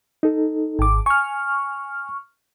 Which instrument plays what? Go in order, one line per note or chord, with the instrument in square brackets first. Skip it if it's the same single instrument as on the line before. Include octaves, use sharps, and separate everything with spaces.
[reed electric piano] D#4 A4
[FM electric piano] G#1 D6
[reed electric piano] G#5 [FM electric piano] C#6 F6